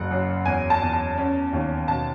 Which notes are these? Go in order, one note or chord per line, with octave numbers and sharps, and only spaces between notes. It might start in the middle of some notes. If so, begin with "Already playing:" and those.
Already playing: F#1 F#5
F#2
E2 G#5
A5
E2
A5
C#4
D#2
B2 A5